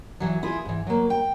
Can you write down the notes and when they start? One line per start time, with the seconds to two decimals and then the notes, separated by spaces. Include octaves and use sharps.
0.20 E3 F#3
0.43 E4 F4 G#4
0.65 G#2 E3
0.87 F#3 A#3
1.10 G5